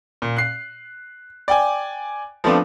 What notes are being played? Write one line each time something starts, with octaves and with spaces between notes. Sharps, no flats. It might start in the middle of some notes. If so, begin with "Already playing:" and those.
A#2
F#6 C7
D5 G5 G#5
F3 A3 B3 C4 D4 F4